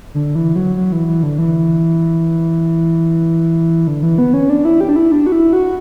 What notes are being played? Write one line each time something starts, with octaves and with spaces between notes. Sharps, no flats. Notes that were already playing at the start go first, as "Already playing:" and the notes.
D3
E3
F#3
F#3
E3
E3
D3
E3
D3
E3
B3
C#4
D4
E4
G4
D4
E4
D4
F#4
E4
F#4